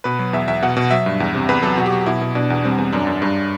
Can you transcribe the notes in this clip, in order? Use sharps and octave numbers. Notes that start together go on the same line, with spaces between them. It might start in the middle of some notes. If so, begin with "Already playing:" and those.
B2 B4
F#3
E2 E5
E2 E5
B2 F#5
B2
F#3 E5
G2
E2
C3
E2 B4
F#3 A4
B2 F#4
G4
F#3 F#4
B2 E4
B2
B2 D4
E2
G3 C4
E2
F#2 D4
F#2
G2